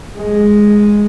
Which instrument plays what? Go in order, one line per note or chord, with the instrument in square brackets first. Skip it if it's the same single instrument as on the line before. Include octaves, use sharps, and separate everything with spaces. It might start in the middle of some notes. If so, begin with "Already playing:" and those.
[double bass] G#3